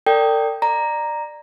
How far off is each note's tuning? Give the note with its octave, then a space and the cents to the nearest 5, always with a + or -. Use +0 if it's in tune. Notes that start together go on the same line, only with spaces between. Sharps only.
A#4 -45 D5 +0 G5 +0
D5 +20 A#5 +0